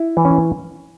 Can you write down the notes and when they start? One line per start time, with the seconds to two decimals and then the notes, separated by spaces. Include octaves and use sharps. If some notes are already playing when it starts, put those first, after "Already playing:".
Already playing: E4
0.17 E3
0.25 C#4